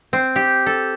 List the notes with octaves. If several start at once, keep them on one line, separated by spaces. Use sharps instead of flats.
C4
G4
A4